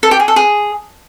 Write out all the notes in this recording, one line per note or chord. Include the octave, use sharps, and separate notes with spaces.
A4
G4
G#4
A4
G#4